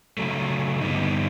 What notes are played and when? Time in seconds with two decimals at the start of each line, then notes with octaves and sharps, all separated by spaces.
0.18 C#3 F#3 A3
0.81 G2 D3 G3 B3 D#4